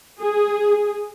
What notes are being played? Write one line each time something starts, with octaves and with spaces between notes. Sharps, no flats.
G#4